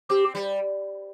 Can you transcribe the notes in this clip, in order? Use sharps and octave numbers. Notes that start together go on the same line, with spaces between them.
C4 G4
G3